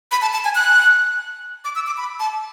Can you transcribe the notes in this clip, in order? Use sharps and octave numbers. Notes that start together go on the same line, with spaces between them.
B5
A5
A5
G#5
F#6
D6
E6
D6
B5
A5